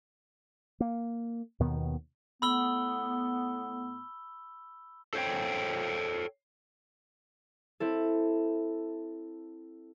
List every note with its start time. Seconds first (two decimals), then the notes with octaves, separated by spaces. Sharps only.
0.80 A#3
1.60 D#2 B2 D#3 B3
2.42 A2 A3 B3 B5 E6 G7
5.14 A4 C5 C#5 G5
7.80 C4 E4 A4